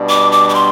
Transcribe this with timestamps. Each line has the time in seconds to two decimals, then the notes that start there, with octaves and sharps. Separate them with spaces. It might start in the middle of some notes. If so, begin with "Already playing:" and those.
Already playing: B2 G3 D4
0.09 D6
0.32 D6
0.49 D6
0.54 C6